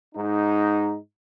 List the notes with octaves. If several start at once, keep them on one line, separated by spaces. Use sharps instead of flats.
G#2 D#4